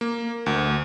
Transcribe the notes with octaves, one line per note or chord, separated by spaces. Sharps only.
A#3
D2